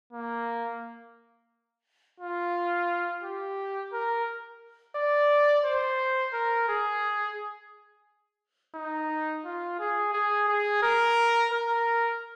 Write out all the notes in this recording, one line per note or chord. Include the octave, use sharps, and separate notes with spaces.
A#3
F4
G4
A#4
D5
C5
A#4
G#4
D#4
F4
G#4
G#4
G#4
A#4
A#4